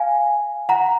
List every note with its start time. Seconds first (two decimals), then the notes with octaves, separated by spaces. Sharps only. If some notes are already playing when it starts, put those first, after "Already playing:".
Already playing: F5 G#5
0.69 F#5 A#5